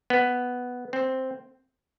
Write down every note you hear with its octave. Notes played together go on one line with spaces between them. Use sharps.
B3
C4